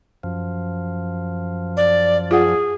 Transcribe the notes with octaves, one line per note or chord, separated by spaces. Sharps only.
F#2 F3
D5
F4 G#4 F#5